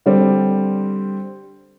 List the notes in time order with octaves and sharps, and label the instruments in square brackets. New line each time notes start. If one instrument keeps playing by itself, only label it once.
[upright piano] D3 G3 C4